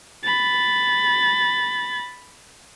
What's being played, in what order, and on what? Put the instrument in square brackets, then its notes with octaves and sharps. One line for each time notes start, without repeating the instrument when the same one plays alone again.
[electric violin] B5 A6